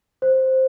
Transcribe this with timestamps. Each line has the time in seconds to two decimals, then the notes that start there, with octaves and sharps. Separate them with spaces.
0.22 C5